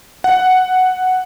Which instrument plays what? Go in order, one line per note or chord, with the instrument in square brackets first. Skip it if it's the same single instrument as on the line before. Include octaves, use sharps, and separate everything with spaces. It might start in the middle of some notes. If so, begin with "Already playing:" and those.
[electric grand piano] F#5